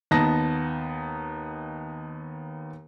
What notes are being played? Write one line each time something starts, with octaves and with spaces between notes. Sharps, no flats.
D#2 B3 D#4 A5 A#6